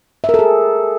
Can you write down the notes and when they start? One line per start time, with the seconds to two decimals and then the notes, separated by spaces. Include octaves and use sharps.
0.24 E5
0.29 A#4
0.34 A4
0.39 G#4